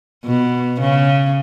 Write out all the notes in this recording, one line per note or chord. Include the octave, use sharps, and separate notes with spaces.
B2
C#3